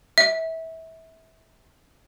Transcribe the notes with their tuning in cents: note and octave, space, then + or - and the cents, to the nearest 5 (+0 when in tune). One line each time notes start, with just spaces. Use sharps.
E5 -25